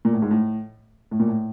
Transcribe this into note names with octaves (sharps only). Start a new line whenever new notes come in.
A#2
A2
G#2
A2
A2
A#2
A2